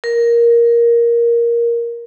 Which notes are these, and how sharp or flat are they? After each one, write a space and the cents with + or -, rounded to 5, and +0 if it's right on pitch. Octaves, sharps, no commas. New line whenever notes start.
A#4 +10